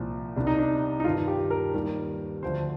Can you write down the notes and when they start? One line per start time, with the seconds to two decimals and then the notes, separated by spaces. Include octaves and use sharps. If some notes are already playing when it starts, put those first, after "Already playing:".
Already playing: C2 A#2 F3
0.36 C2 C3 G3 D4
0.47 D#4
0.58 D4
1.00 D#4
1.04 G2 D#3 G3 F4
1.28 G4
1.50 A#4
1.74 D#2 D#3 G3
2.43 D2 D3 F3 C5